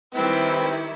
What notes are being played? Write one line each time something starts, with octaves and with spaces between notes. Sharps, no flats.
D#3 G3 C4 E4 B4